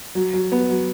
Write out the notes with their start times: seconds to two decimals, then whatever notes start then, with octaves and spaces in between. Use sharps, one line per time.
0.15 F#3
0.34 F#3
0.52 B3
0.69 F#3